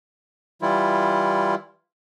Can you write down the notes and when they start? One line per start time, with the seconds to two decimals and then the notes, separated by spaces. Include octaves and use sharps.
0.62 E3 G3 E4 F4